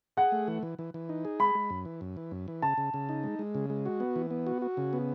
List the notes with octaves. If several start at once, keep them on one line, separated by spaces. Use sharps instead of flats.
G#4 F#5
A3
E3
E3
E3
E3
D#4
G#4
G#3 B5
G#3
F#2
E3
F#2
E3
F#2
E3
C#3 A5
C#3
C#3
D#4
G#3
G#3
C#3
G#3
F#4
B3
E3
B3
F#4
F#4
C#3
B3